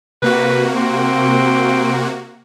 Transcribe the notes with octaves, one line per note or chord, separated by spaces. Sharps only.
C3 A#3 F#4 B4
C4